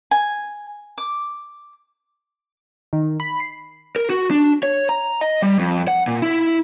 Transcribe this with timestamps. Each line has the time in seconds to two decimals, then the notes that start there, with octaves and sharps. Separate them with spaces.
0.11 G#5
0.98 D6
2.93 D#3
3.20 B5
3.40 C7
3.96 A#4
4.10 F#4
4.31 D4
4.63 C#5
4.89 A#5
5.21 D#5
5.42 G3
5.59 F2
5.88 F#5
6.07 A#2
6.22 E4